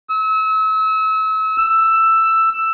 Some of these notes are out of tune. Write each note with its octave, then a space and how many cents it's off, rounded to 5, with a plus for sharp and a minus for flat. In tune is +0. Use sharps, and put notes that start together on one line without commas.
E6 -35
E6 +10